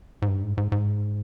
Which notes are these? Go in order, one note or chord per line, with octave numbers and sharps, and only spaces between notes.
G#2
G2
G#2
G#2
G#2